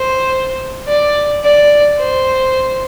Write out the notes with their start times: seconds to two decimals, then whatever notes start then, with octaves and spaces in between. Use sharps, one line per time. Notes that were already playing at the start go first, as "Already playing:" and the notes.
Already playing: C5
0.88 D5
1.43 D5
1.99 C5